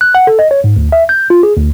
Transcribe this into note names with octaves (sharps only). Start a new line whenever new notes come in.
F#6
F#5
A4
D#5
C#5
G#2
D2
E5
G6
F4
G#4
D2